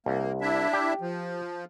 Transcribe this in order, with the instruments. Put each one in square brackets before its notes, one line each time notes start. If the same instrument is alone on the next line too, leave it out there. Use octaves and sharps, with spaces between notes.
[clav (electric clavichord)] C2 [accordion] A#3
[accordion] D4 E4 E5
[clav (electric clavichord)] G4
[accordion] F3